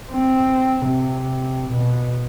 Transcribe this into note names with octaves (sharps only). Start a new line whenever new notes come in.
C4
C3
B2